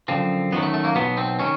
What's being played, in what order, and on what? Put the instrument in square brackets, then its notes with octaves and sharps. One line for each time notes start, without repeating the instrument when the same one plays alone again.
[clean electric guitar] F#2 D3 F3 C4
F#2 D#3 F#3 B3
A3
A3
A#3
B1 B2 F#3 B3
C4
D#3 C#4